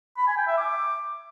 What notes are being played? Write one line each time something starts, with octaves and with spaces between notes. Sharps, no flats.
B5
G#5
G5
E5
D6